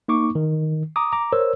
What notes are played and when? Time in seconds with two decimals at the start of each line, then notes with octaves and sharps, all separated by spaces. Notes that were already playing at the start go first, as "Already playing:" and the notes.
0.08 A#3 D#4 C#6 D6
0.35 D#3
0.96 A#5 D6 D#6
1.13 A#5 D6
1.33 A#4 C5 C#5 E6